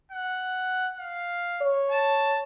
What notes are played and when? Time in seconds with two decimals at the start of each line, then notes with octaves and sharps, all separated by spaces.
0.12 F#5
0.98 F5
1.61 C#5
1.91 A5